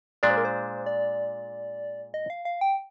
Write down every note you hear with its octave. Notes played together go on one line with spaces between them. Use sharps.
A#2 G#3 D4 D5
C5
A#4
C5
D5
D#5
F5
F5
G5